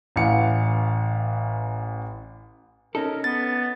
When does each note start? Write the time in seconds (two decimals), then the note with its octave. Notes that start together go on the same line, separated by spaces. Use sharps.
0.16 A1 E3 F5 F#5 C#7
2.95 C#4 D#4 A4 A#4
3.24 B3 A6